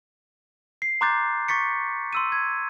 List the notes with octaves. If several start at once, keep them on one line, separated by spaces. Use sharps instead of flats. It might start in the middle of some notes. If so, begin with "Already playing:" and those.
C7
A#5 C6 D6 F#6 G6 A6
C#6 A6 B6 C#7
C6 E6 D#7
G#6